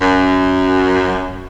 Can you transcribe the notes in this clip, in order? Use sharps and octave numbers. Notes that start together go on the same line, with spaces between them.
F#2